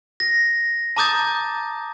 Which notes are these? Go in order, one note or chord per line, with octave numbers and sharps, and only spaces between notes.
A#6
A5 A#5 D6 D#6 G6 A6